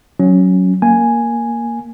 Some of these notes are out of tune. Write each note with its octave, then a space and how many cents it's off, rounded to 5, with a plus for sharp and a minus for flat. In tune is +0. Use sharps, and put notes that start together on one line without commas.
F#3 +0 C#4 +0
A#3 +0 G#5 +0